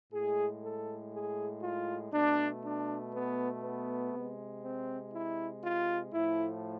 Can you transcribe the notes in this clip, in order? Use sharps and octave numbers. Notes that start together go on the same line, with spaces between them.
A2 G#3 G#4
A4
G#4
F4
B2 A3 D4
D4
B3
B3
C3 G#3
C4
E4
F4
A2 F3 A3 E4